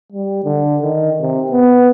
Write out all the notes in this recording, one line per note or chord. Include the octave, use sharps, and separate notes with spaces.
G3
D3
D#3
C3
B3